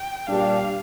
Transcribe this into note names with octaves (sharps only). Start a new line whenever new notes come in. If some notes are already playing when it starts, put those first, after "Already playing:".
Already playing: G5
A#2 G3 D4 G4 F5